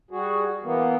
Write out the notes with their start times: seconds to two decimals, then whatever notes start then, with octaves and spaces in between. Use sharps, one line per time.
0.11 G3 F#4 G#4
0.63 E3 A#3 B3